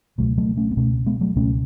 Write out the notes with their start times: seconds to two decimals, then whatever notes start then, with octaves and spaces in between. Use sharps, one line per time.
0.18 C#2 B2 F#3 A3
0.38 F#3 A3
0.57 A3 C#4
0.71 B3
0.76 C#2 B2 A3 C#4
1.06 G#3 B3
1.21 F#3 A3
1.35 C#2 B2 A3 C#4